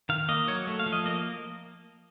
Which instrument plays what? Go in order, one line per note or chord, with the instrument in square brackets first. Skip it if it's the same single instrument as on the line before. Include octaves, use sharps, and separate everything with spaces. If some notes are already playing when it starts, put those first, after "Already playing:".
[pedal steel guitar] D#3 F5
A#3 D#5
F#3 C#5
A3
F5
F3
D#5
A#3 D#5